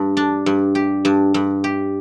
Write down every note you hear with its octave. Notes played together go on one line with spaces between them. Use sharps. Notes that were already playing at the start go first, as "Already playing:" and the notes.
Already playing: G2
D4
G2
G4
G2
G2
G4